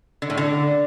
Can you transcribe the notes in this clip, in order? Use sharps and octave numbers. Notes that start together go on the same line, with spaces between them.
D3
A2
D3